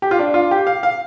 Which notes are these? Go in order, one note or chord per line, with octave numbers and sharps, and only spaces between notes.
G4
F4
D4
F4
G4
F5
F5